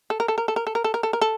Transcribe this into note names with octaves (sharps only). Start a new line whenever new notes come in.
A4
A#4
A4
A#4
A4
A#4
A4
A#4
A4
A#4
A4
A#4
A4